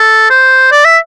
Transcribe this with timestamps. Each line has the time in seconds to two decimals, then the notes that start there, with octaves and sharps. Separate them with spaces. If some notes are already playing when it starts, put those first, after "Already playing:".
Already playing: A4
0.30 C5
0.72 D5
0.85 E5